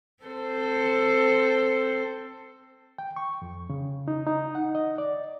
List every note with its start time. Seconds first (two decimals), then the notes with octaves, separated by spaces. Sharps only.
0.24 C4 A4 C5
2.98 G5
3.16 C#6
3.42 F2
3.70 C#3
4.08 D#4
4.27 D#4
4.55 F#5
4.75 D#5
4.98 D5